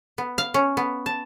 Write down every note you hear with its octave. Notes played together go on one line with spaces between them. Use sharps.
B3
F5
C#4
B3
A5